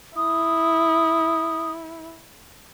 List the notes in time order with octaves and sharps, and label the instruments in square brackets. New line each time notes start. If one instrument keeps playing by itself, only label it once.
[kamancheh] E4 [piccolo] D#6